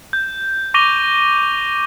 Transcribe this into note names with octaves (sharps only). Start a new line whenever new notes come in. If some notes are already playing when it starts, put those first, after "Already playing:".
G6
C#6 D6 A#6 D#7 F7 G7